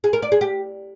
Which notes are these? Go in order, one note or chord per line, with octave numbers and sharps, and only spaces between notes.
G#4
A#4
D5
G#4
G4